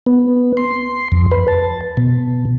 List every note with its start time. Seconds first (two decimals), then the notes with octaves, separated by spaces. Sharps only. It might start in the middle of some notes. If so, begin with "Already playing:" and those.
0.06 B3
0.57 C6
1.12 F2
1.32 B4
1.48 A5
1.97 B2